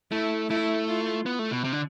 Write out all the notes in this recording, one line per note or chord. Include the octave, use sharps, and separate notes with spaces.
A3 E4
A3 E4
F4
B3
A3
B2
C3
D3